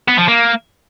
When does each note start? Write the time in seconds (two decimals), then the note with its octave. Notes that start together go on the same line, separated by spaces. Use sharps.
0.08 B3
0.18 F3
0.28 A#3